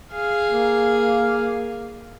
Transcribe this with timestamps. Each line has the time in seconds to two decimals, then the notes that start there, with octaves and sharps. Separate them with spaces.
0.12 G#4 F5
0.50 A#3